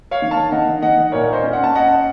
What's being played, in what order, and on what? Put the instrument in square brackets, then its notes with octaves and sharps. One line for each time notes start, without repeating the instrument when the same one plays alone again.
[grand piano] C#5 F5
D#3
F5 A5
D#3 D#5 F#5
D#3 D#5 F#5
A#2 A#4 C#5
C5 D#5
C#4
F#5
A5
C#4 D#5 F#5